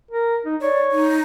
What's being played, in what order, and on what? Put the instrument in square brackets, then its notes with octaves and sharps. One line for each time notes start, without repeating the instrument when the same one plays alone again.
[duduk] A#4
D#4
[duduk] C#5 [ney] D5
[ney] D#4